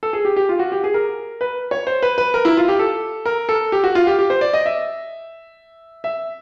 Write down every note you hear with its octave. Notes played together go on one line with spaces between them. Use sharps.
A4
G#4
G4
G4
F4
F#4
G4
G#4
A#4
B4
C#5
C5
B4
B4
A#4
E4
F4
G4
A4
A#4
A4
G4
F#4
F4
G4
G4
C5
D5
D#5
E5
E5